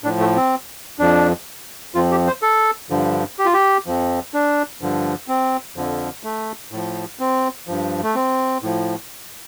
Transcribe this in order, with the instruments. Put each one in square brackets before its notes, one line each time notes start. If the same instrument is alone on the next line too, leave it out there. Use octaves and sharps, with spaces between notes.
[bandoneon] A2 D4
F3
A3
C4
F2 F3 D4
F2 F3 F4
G4
C5
A4
G2 D3 F3
G4
F4
G4
F2 F3
D4
G2 D3 F3
C4
F2 D3 F3
A3
A2 F3
C4
G2 F3
A3
C4
A2 F3